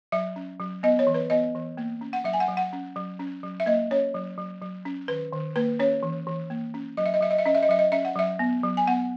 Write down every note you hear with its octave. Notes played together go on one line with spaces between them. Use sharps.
F#3 E5
C#4
F#3
B3 D#5
C#5
E3
B4
B3 D#5
E3
A#3
C#4
F#5
F#3 E5
G#5
F#5
F#3
F#5
C#4
F#3
C#4
F#3
E5
A#3 D#5
C#4 C#5
F#3
F#3
F#3
C#4
D#3 B4
D#3
A#3 B4
C#4 C#5
E3
E3
A#3
C#4
F#3 D#5
E5
D#5
F#3 E5
D#5
E5
C#4 D#5
E5
D#5
F#3 E5
D#5
C#4 E5
F#5
F#3 E5
B3
F#3
G#5
B3 F#5